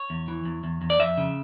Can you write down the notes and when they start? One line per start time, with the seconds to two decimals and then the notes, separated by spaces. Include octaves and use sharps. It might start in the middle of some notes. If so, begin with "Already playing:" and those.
Already playing: C#5
0.10 E2
0.28 E3
0.45 E2
0.64 E2
0.82 E2
0.90 D5
0.99 F2 E5
1.18 C#3